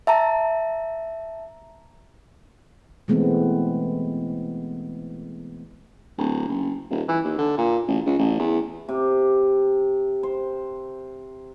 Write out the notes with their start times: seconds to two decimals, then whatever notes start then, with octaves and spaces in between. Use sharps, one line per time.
0.07 E5 A5 A#5
3.08 B2 E3 G#3 A3 B3 C4
6.18 D1
6.48 F#1
6.90 D#1
7.08 E3
7.24 D#2
7.38 D3
7.58 A#2
7.88 A1
8.06 C#2
8.19 A1
8.39 E2
8.89 C3
10.23 C5